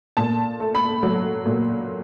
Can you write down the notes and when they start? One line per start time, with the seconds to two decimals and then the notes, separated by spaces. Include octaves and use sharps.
0.17 A#2 A5
0.60 A3
0.75 B5
1.03 F#3
1.46 A#2